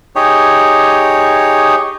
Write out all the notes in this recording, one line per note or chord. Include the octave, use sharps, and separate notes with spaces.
D#4 G4 G#4 C#5